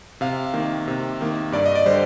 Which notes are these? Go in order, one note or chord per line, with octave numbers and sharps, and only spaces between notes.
C3 F5
D#3 A#3
C3
D#3 A#3
G2 D5
D#5
D5
D3 G3 C5